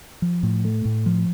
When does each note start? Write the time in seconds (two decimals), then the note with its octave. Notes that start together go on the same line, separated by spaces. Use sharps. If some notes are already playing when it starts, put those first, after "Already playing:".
0.22 F3
0.43 A2
0.65 A3
0.85 A2
1.06 F3